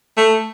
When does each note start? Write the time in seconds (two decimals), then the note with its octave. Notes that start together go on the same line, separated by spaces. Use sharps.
0.17 A3